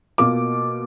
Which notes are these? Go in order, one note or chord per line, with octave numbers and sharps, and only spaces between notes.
B2 A#3 F4 D6